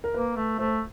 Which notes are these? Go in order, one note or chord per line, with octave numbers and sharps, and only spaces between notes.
A#4
A#3 B4
A3
A3 C5